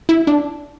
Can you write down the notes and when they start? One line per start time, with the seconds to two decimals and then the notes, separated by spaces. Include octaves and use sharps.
0.09 E4
0.27 D4